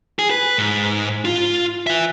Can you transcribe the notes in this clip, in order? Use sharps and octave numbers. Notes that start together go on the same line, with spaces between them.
G#4
B4
G#2
F4
B4 E5